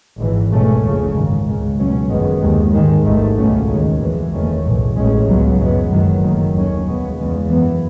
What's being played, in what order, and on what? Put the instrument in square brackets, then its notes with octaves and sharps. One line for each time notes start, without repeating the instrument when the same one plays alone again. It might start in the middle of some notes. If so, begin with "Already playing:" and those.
[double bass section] G#1 G#2 E3
C#2 B2 A3 C#4
F#1 E2 C#3
G#1 G#2 D#3
C#2 C#3 G#3
C#2 B2 F#3 A3 C#4
G#1 F#2 D#3 G#3 B3
D#2 D#3 G#3
G#2 D#3 G#3
A1 G#2 D#3 A3
C#2 B2 F#3 A3 C#4
D#2 D#3 G#3
F#2 E3 G#3
F#1 E2 D#3 A3 C#4
B1 A2 E3 G#3
A1 A2 G#3 C#4
C#2 C#3 F#3 B3
F#2 E3 G#3 B3
F#1 F#2 D#3 F#3
F#1 F#2 D#3 A3
D#2 D#3 F#3 C#4
C#2 C#3 G#3 B3
E2 C#3 G#3 B3
F#2 E3 B3